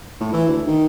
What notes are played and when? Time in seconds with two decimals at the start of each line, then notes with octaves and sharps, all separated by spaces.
0.20 A2
0.33 E3
0.48 D2
0.67 D#3